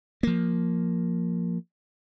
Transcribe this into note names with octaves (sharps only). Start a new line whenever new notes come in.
F3 A#3